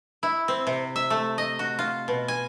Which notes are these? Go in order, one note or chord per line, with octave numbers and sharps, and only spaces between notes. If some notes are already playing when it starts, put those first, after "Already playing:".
E4
C4
C3
E5
A3
D#5
F#4
F4
B2
G#5